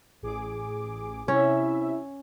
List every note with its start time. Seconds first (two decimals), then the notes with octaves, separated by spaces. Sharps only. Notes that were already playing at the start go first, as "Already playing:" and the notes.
0.22 A1 G#4 D6
1.28 C3 C#4 E4 E5